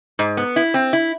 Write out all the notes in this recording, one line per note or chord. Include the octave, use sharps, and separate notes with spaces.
G#2
B3
E4
C4
E4